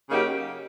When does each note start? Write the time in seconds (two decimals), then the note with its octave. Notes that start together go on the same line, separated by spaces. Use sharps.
0.09 C#3 F#3 A#3 D#4 G4